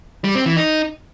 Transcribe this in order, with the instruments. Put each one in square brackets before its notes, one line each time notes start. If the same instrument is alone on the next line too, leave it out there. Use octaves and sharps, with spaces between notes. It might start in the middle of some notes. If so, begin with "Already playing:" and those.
[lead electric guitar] G3
C4
E3
D#4